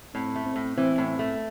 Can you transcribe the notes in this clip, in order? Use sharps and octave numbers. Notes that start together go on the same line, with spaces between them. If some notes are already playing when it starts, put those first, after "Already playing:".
A2 C4
A3
C4
A2
E3 C4
A2
C4
A3